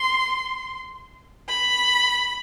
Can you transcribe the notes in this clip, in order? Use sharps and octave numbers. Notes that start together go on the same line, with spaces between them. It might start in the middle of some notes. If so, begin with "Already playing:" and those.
Already playing: C6
B5